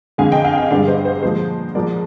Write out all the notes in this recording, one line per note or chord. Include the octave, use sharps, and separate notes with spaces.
F2 D3 G#3 F5 G#5
D#5 G5
F5 G#5
D#5 G5
G2 D3 G#3 D5 F5
C5 D#5
C5
A#2 F3 G#3 C5
G#2 F3 G#3 A#4 D5